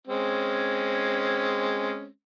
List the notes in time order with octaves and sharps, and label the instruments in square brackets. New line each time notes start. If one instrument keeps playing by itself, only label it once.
[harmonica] G#3 C4 C#4